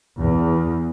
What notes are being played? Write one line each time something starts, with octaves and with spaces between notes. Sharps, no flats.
E2